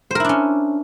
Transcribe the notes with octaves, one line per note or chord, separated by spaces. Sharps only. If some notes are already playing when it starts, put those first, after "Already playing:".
C#4 D4 E4 A#4 C5